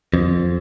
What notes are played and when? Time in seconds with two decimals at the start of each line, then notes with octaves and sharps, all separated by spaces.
0.14 F2